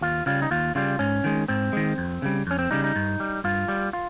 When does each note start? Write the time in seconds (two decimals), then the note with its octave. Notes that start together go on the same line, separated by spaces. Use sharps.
0.01 D#2 F4
0.26 C#3 G3 F4
0.42 D#4
0.51 D#2 F4
0.75 C#3 G3 F4
0.99 G#2 C#4
1.24 D#3 G#3
1.48 G#2 C4
1.73 D#3 G#3
1.98 F2
2.22 C#3 G3
2.47 F2 C#4
2.59 C4
2.71 C#3 G3 D#4
2.84 D#4
2.96 G2
3.20 G3
3.44 G2 F4
3.68 G3
3.93 F4